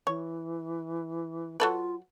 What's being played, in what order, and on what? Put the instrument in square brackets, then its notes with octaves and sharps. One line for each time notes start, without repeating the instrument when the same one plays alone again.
[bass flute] E3 [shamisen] C#5
[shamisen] F#3 A4 B4 [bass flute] F4